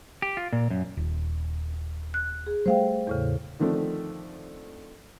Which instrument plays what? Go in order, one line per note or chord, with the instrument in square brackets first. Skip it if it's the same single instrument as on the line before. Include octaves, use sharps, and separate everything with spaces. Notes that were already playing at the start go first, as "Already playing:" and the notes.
[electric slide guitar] G4
F4
A#2
F#2
[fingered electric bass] D#1
[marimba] F#6
G#4
[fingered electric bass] G3 A3 [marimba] C5 F5 G5
[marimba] E2 A2 C#3
[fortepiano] D3 D#3 F3 A3 C4 D4